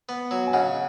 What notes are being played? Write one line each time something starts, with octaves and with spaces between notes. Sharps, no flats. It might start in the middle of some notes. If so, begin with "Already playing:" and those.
B3
F#3
G#5
C#3 D#5 F#5